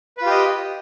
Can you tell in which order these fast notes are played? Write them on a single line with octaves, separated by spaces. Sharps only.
B4 F4 G4 D#5